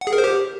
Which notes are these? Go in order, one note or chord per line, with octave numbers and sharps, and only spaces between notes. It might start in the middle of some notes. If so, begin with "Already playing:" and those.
F#5
G#4
A#4
C5
G4